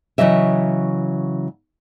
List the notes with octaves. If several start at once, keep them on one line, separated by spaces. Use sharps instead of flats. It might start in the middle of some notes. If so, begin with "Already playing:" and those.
C#3 E3 F#3 D#5 E5